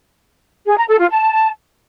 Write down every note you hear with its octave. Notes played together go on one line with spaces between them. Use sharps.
G#4
A#5
A4
F4
A5